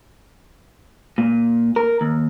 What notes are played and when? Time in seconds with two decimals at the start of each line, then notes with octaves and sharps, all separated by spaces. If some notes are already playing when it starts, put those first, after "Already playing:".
1.18 A#2
1.76 A#4
2.01 D#2